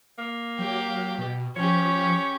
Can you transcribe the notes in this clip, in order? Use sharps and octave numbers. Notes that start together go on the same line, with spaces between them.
A#3
F#3 G4
B2
F3 C#4 G4 C#5